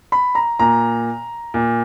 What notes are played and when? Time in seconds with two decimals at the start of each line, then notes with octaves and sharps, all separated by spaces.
0.12 B5
0.35 A#5
0.59 A#2 A#5
1.54 A#2